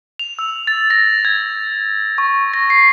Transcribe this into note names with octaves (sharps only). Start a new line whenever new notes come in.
F7
E6
A6
A#6
G#6
C#6
A#6
C7